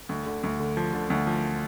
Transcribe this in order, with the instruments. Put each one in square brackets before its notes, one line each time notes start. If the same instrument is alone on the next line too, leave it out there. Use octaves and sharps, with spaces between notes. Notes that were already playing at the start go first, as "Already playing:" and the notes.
[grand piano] D2
D3
D2
D3
F3
D3
D2
F3